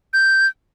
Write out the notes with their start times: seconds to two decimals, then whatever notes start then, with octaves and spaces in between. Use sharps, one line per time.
0.14 G6